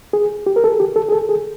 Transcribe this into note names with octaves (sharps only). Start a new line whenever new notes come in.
G#4
G4
A#4
A4
G#4
G4
A4
G#4
A4
G#4